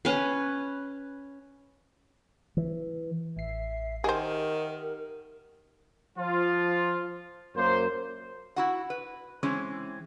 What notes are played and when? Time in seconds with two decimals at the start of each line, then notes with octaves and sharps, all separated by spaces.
0.05 C#4 B4
2.57 E3
3.37 A1 E5 C7
4.04 D#3 G4 G#4 A#4 C5 E5 F#5
6.19 F3 F4
7.56 F#2 A#3 C5
8.56 E4 F#4 F#5
8.90 B4
9.43 E3 G#3 C4 C#4